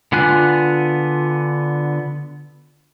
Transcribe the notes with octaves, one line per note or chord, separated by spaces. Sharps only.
D3 B3 F4 G#5 F#6